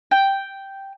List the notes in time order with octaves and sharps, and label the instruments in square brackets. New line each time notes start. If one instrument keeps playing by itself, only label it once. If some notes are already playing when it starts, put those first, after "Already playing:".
[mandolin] G5